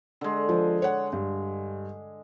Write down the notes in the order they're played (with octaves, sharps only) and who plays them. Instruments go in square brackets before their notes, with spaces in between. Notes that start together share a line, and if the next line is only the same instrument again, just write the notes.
[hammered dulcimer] D3 G#3
[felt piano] F3
C#5 F#5
G2